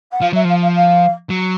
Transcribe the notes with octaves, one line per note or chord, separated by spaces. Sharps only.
F#5
F3 F5
F#3 E5
F3 F5
F5
F5
F#3